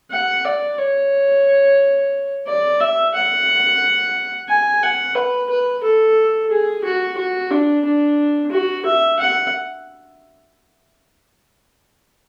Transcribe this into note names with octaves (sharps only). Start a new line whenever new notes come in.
F#5
D5
C#5
D5
E5
F#5
G#5
F#5
B4
B4
A4
G#4
F#4
F#4
D4
D4
F#4
E5
F#5